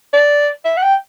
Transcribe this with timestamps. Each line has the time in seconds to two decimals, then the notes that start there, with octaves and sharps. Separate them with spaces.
0.14 D5
0.65 E5
0.77 F#5
0.83 G5